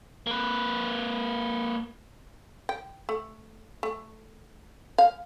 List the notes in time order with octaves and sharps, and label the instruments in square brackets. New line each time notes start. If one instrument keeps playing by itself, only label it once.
[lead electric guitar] A#3 B4
[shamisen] G5
A3
A3
F5